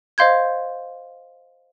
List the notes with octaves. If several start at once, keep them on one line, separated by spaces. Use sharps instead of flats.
C5 D#5 F5 C6 G6 G#6